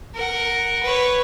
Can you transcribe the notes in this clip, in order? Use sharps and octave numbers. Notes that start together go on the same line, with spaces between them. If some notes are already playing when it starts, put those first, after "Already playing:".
A#4 F#5
B4 C#5